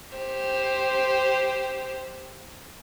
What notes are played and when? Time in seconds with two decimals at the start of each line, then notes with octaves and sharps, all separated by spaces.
0.14 G4 C5